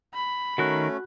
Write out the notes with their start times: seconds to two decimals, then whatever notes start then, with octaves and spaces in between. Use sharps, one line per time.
0.14 B5
0.58 D#3 A3 C#4 F#4 A#4 F#6